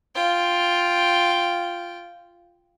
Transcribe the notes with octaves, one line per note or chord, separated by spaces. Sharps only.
F4 G5